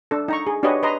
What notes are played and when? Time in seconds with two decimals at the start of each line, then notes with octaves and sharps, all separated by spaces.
0.11 D4 A4
0.28 D#4 A#5 C#6
0.47 G#4
0.63 D4 F#4 G4 B4 C#5 D#5
0.83 B4 D#5 A#5 C6